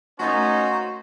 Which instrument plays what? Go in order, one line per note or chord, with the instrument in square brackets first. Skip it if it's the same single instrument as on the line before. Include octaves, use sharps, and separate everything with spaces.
[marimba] A3 A6 [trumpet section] A#3 C#4 D#4 [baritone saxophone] F#4 [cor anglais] C5